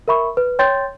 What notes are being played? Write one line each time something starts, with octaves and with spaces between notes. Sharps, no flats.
A#4 E5 B5 C#6
B4
C#5 G5 C6 G6 A6